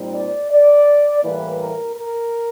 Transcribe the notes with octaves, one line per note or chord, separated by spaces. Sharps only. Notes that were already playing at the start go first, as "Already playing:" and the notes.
Already playing: A#2 G3 C4 D#4
D5
D5
A2 E3 G3 A#3 B4
A#4
A#4